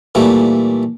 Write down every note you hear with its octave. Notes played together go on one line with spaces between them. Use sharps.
A#2 E3 G3 A3